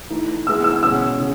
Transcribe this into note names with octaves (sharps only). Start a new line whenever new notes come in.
E3 A3 D#4
E3 G#3 B3 E4 E6
E6
B2 G#3 C#4 E6
C#3